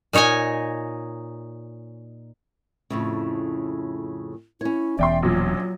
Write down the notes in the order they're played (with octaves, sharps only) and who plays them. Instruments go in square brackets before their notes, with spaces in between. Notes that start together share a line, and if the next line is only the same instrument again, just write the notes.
[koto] A#2 D#4 C#5 D#5 G#5
[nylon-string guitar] F2 A2 C#3
[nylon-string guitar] C#4 C#5 [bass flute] E4
[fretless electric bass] E1 E2 [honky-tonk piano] D5 G5 C6 [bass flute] E5
[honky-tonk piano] A#1 A#2 [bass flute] F#3